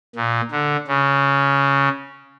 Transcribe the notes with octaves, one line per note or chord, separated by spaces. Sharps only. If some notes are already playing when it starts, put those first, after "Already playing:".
A#2
D3
C#3